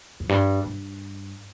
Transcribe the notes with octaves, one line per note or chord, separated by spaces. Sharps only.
F2
G2
G2